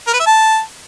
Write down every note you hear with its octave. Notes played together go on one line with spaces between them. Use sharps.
A#4
B4
E5
A5